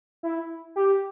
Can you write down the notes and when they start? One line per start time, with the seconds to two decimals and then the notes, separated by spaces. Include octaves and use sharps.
0.23 E4
0.76 G4